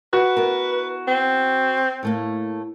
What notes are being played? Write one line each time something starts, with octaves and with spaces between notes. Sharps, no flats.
F#4 B4
B3 E4 A#4
C4
A2 A3 A#3